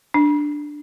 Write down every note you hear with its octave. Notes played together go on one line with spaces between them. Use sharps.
D4